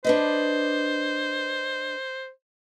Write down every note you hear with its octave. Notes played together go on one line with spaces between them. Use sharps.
D4 B4 C5 D#5